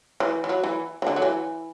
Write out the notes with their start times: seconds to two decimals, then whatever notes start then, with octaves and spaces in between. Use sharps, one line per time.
0.20 E3
0.44 E3
0.49 F#3
0.64 E3
1.02 E3
1.07 D3
1.16 F#3
1.22 E3